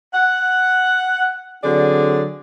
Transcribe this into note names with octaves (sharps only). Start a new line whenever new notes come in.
F#5
D3 F#3 C4 G#4 D5